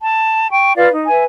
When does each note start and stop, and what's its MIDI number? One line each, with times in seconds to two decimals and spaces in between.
0.03 0.48 81
0.52 0.75 79
0.52 0.75 85
0.76 0.88 65
0.76 0.88 71
0.76 0.88 74
0.76 0.88 77
0.93 1.06 63
1.07 1.23 71
1.07 1.23 76
1.07 1.23 80